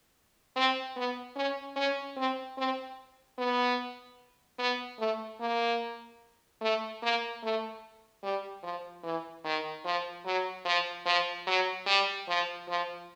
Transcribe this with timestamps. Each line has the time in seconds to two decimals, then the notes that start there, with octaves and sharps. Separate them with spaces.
0.56 C4
0.96 B3
1.36 C#4
1.76 C#4
2.17 C4
2.58 C4
3.38 B3
4.59 B3
4.99 A3
5.41 A#3
6.61 A3
7.03 A#3
7.43 A3
8.23 G3
8.63 F3
9.03 E3
9.44 D#3
9.85 F3
10.25 F#3
10.65 F3
11.06 F3
11.47 F#3
11.86 G3
12.28 F3
12.68 F3